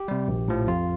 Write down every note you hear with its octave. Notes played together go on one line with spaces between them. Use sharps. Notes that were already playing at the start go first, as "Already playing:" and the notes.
Already playing: G4
C3 G3
A#1
A2 F3
F2 F4